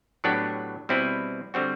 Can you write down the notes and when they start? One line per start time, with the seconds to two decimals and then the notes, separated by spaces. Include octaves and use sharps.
0.24 A2 F#3 B3 D4 G4
0.89 B2 G3 C4 E4 B4
1.54 D3 G3 C4 F#4